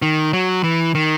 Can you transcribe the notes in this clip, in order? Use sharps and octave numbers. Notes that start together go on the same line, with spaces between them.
D#3
F#3
E3
D#3